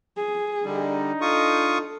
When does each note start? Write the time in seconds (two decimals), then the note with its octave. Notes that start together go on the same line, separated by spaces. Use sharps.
0.17 G#4
0.65 D3 G3 D4 D#4
1.21 F4 A4 C#6 D#6